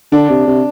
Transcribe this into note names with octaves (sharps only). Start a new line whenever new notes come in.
D3 D4
C3
C3